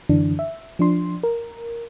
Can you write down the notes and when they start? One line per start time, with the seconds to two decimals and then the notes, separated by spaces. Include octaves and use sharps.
0.09 F#2 D3 E3 D4
0.39 E5
0.79 F3 D4 C6
1.23 A#4